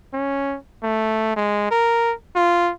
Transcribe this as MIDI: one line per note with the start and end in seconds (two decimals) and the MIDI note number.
0.13 0.56 61
0.83 1.36 57
1.36 1.70 56
1.71 2.13 70
2.35 2.72 65